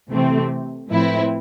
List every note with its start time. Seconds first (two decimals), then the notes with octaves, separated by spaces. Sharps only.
0.10 C3 E3 A3 C4
0.89 A2 F3 C4 E4 B4